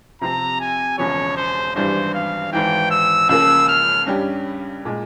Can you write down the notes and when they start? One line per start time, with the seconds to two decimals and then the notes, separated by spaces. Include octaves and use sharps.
0.21 C3 F3 C4 A#5
0.60 G#5
0.98 E1 E2 C#3 F3 C#5
1.37 C5
1.75 G#1 G2 E3 G3 C5
2.14 F5
2.52 G#1 G#2 E3 G5
2.91 E6
3.29 C#2 C#3 F3 A#3 E6
3.68 F6
4.06 G2 G3 C#4 G4
4.85 A#2 G#3